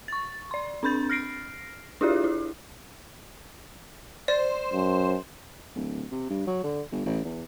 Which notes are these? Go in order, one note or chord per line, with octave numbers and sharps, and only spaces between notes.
C#6 A6
D5 C6
C4 D4 B5 G6 A6
F6 A#6 C7 D7
D4 E4 F4 G4 G#4 D5
E4
C5 D5
F#2
D1
C3
G2
F#3
D3
G1
A1
E2